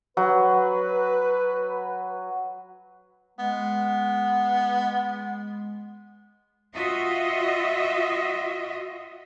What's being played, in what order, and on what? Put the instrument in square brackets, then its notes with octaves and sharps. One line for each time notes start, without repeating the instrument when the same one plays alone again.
[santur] F#3 [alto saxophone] B4
[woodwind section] G#3 [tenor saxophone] B3
[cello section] F4 F#4 D#5 E5